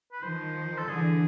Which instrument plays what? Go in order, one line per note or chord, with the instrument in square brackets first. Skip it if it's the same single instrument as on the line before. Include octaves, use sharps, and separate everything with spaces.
[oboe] B4
[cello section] D#3 F3 [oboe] C5
[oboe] A4
[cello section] D3 E3 [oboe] G#4